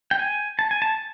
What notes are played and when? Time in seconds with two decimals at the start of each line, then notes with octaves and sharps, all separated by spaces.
0.11 G5
0.19 G#5
0.59 A5
0.71 G#5
0.82 A5